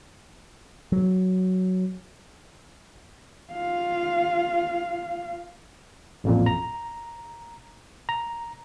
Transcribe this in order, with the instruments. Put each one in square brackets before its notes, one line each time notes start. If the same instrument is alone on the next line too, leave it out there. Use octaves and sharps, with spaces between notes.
[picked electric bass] F#3
[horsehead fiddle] F4 F5
[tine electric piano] A1 F2 A#2
A#5
A#5